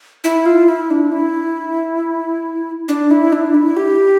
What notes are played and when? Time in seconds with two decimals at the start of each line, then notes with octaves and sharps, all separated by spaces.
0.24 E4
0.46 F4
0.68 E4
0.90 D4
1.12 E4
2.88 D4
3.11 E4
3.33 D4
3.54 E4
3.77 G4